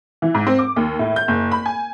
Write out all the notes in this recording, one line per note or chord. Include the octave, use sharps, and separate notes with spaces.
E3
G#2
C4
D6
D#2
A2
G6
F#1
B5
G#5